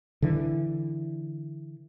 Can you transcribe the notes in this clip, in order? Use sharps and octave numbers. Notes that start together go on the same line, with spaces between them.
D3 E3